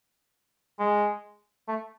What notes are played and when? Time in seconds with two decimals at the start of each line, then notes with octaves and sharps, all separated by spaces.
0.79 G#3
1.68 A3